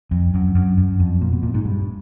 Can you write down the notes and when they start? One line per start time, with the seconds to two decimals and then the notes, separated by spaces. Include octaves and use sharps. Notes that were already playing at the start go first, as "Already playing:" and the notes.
0.11 F2
0.34 F#2
0.55 F#2
0.77 F#2
1.00 F2
1.21 A#2
1.32 B2
1.43 A#2
1.54 G#2
1.65 G2